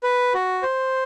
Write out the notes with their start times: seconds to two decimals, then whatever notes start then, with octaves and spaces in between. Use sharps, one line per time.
0.03 B4
0.34 F#4
0.63 C5